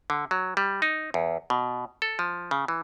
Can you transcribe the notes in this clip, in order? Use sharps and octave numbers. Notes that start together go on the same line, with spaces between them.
D3
F#3
G3
D#4
E2
B2
A4
F3
C#3
E3